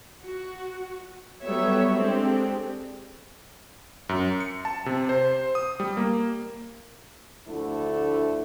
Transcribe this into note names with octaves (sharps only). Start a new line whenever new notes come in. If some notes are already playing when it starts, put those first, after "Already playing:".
F#4
F#3 G3 B3 A4 C#5 E5
G#3 C4 D4 G4 A4
F#2
C#7
A5
C3
C5
D#6
G3
A#3
D2 D3 F3 A3 E4 A4